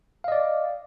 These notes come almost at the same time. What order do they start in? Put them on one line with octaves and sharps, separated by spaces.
F5 D#5 D5